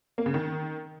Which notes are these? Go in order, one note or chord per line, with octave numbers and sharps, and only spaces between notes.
A#3
C#3
D#3